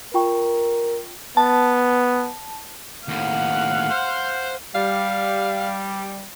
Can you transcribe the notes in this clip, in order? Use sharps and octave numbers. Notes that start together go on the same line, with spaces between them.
F4 A#4 G5 C#6
B3 A5
D#2 A2 F5 F#5
C5
G3 F5